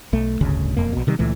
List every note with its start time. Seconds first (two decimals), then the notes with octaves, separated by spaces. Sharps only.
0.13 B1 A3
0.41 D1 G1 D2 C#3
0.77 E1 F2 A#3
0.93 A#1 B2
1.07 C3 D#3 G3
1.19 C#2 A#2 E3 A3